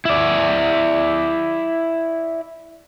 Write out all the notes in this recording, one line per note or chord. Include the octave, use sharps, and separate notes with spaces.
E4 D5